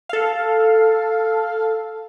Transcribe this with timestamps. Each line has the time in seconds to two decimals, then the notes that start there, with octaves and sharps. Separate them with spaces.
0.09 A4 F5